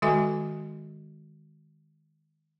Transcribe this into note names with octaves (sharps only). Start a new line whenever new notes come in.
D#3 G#3 F#4 A4 E5 G#5